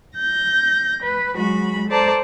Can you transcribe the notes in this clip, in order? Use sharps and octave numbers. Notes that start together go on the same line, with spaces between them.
G6 A#6
B4
F#3 G#3 F#4 B5
A4 C5 D5 A5 A#5